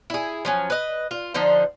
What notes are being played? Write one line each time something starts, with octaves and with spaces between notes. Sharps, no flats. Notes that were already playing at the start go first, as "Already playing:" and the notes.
E4 G#4
F3 F#3 C#4
B4 D#5
F4
D3 F3 D#4 C5